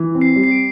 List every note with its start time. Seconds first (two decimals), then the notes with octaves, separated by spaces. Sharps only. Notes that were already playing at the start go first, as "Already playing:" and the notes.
Already playing: E3
0.15 C4
0.21 C7
0.36 G3
0.44 C7
0.51 D7